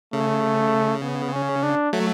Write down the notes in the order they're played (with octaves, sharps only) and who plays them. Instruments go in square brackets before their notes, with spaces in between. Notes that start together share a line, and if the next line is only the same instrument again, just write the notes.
[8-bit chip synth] C#3 [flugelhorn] A3
[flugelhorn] B3
C#4
D4
[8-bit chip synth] F#3 A3